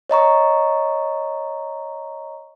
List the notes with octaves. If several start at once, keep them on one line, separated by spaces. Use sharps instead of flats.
C#5 D#5 A#5 C#6